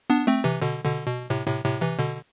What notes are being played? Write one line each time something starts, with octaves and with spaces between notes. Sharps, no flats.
B3 D4
A3 C4
C3 E3
B2 D3
B2 D3
B2
A2 C3
A2 C3
A2 C3
C3 E3
B2 D3